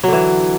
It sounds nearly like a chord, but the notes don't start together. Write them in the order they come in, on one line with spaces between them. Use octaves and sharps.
F#3 D3 E3